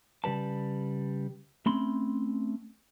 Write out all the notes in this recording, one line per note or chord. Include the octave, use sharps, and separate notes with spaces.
C#3 G3 B4 A5
A3 C4 C#4 B5 C6